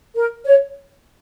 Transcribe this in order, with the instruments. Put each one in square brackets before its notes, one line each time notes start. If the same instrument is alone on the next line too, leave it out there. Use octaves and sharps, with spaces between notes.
[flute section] A#4
C#5